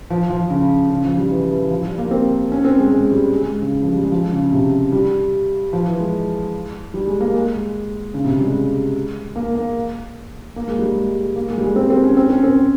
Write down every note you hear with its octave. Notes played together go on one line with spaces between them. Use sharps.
F3
F3
C#3
C#3
F3
G3
E3
E3
F3
G3
A#3
C4
C#4
C4
G#3
G#3
G3
G#3
G#3
C#3
F3
G3
G#3
F3
C#3
C3
G3
F3
E3
G#3
G3
G#3
A#3
G#3
C#3
C3
C#3
G3
G#3
A#3
A#3
A#3
G#3
G3
G#3
A#3
G#3
G3
G#3
C4
C4
C#4
C4
C#4
C4